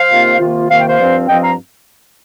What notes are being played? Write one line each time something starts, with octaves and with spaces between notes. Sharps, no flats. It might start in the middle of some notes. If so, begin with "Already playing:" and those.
Already playing: C5 F5
C3 D#3 A#3 F4
C3 D#3 A#3 F4
C3 D#3 A#3 F4 F5
G5
C5 F5
G2 F3 C4 F4
G2 F3 C4 F4 D#5 G5
F5 A#5